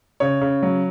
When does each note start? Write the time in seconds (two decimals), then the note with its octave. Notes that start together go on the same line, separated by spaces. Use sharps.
0.20 C#3 C#5
0.41 C#3
0.63 F#3